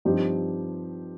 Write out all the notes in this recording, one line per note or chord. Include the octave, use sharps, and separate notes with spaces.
G2 F3 C4 D#4 G4